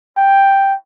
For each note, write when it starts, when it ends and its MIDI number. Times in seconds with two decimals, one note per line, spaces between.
0.17 0.74 79